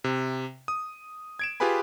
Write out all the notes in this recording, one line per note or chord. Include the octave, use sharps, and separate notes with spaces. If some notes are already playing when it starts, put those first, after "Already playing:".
C3
D#6
G#6 D7 E7
F4 G4 G#4 B4 G#5 B5